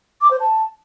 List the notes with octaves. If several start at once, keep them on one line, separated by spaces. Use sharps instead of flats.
D6
C5
A5